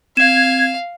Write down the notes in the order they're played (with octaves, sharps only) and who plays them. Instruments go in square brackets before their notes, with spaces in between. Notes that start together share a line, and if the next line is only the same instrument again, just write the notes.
[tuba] C4 [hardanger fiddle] F5 [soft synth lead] G#6 [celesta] E7